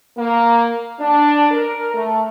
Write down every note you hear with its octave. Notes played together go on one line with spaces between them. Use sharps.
A#3
D4
A#4
A3